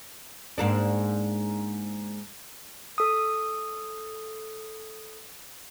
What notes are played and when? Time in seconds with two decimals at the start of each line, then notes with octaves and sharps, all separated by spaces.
0.58 G#2 A#3 D4
2.98 A4 D#6